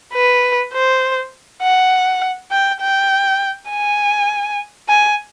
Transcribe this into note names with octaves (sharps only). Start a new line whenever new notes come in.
B4
C5
F#5
G5
G5
G#5
G#5